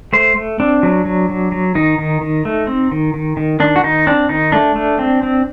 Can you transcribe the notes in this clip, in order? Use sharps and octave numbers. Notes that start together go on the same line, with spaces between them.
A3 C5
A3
C4 D4
F#3
F#3
F#3
F#3
D#3 D#4
D#3
D#3
A3
C4
D#3
D#3
D#3
D#3 D4
F#4
D#3 D#4
C4 D4
D#3 D#4
A3 D4
A3
C4
C4